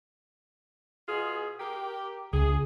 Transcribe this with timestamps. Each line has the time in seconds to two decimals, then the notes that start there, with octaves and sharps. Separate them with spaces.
1.08 B2 F4 G#4
1.60 G4 A#4
2.33 C#2 G#4